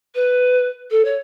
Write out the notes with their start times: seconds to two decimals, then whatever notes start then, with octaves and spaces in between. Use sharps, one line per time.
0.15 B4
0.91 A4
1.05 C#5